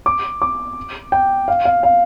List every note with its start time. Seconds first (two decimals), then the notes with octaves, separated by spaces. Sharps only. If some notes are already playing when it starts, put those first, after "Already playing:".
0.06 D6
0.42 D6
1.12 G5
1.48 F5
1.65 F5
1.83 F5